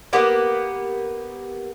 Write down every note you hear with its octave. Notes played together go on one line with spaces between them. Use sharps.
A#3 B3 G4 B4